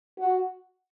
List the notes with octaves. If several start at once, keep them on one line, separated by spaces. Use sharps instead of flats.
F#4